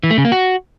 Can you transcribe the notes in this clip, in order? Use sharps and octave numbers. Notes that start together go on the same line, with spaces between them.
E3
A3
C#3
A#3
F#4